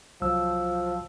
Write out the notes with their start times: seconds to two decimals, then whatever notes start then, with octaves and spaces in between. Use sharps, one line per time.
0.22 C2 F3 F#3 E6